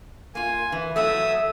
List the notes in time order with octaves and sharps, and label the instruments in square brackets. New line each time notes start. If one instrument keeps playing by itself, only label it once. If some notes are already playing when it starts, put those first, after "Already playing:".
[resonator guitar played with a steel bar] A#3 F4 [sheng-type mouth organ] G#5
[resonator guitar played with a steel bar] E3
[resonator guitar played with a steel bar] E2 F#3 A3 [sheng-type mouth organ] E5 D#6